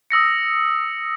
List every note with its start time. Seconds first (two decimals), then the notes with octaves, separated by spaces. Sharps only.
0.10 D#6 E6 A#6 C#7